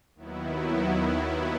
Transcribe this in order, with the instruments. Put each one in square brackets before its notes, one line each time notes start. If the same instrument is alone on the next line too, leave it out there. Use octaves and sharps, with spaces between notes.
[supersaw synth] D#2 D#3 F#3 B3 E4